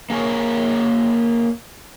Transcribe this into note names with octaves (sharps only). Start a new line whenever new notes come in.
A#3 G#4 A#4 C#5